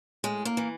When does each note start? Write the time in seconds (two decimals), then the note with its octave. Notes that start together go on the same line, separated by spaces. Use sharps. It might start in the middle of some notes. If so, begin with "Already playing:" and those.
0.24 A2 G#3
0.45 A#3
0.57 E3